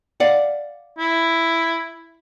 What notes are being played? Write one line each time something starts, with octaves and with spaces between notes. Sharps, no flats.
D5 F5 F#5
E4